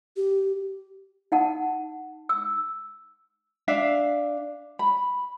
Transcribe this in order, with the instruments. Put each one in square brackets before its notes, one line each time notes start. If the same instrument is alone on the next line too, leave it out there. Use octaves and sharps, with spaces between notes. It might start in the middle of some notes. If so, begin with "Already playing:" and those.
[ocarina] G4
[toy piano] D#4 F#5 A5
E6
[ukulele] D4 E5 F5
B5